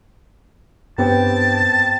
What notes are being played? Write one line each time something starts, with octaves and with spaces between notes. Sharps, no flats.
G2 B3 C4 G4 G5 A5